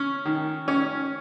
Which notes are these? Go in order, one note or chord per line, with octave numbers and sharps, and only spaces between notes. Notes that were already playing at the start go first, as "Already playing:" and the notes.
Already playing: C#4
D#3
C#4